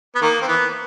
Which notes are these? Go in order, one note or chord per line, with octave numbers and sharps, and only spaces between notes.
B3
D#3 A#3
C4
E3 B3